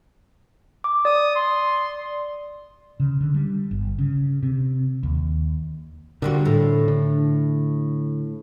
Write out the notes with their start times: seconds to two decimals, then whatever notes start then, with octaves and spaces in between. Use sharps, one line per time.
0.84 D6
1.05 D5 D#6
1.36 C6
3.00 C#3
3.21 D3
3.34 G3
3.71 G1
3.99 C#3
4.43 C3
5.03 D#2
6.22 A#2 D3 G3 F#4
6.46 A2
6.88 D3